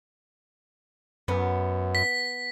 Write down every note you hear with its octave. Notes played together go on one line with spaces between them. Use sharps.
F#2 B3
B6